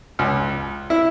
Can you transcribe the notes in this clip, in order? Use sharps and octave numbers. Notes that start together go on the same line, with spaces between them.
C#2
E4